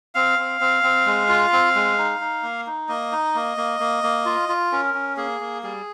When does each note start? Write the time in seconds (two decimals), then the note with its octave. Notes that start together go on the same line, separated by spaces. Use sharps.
0.15 C4 F5
0.39 C4
0.61 C4
0.83 C4
1.06 G#3
1.29 F4
1.53 C4
1.75 G#3
1.98 D#4
2.21 D#4
2.43 A#3
2.67 D#4
2.89 A#3 D#5
3.12 D#4
3.35 A#3
3.57 A#3
3.80 A#3
4.03 A#3
4.25 F4
4.49 F4
4.72 C#4 A#4
4.94 C#4
5.17 A#3 G#4
5.40 A#3
5.63 G3 G#4